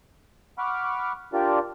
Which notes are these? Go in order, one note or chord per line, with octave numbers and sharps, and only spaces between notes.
F#5 B5 C#6 D6 F6
D4 F4 G4 A#4 D5